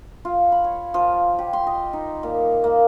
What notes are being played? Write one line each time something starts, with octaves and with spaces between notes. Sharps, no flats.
F4
B5
C#5
F3
G4
C6
D#5
D#4
A#2
A#3